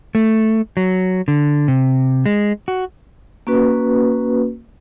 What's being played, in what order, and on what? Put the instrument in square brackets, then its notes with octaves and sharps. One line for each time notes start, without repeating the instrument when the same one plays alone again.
[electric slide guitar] A3
F#3
D3
C3
G#3
F#4
[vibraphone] A#3 C#4 F#4 B4